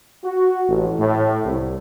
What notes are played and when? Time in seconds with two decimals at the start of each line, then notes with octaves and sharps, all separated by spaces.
0.24 F#4
0.68 A1
0.98 A2
1.44 C2